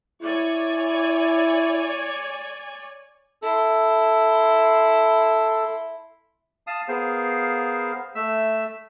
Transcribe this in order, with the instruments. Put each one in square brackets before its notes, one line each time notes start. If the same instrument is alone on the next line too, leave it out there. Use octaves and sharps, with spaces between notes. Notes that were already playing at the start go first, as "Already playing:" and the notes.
[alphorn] E4 [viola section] C#5 D5 G#5
[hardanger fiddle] E4 C6 [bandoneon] A4
[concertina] F5 A5 D#6
B3 G#4 A#4 C5 F5
A3 E5 E6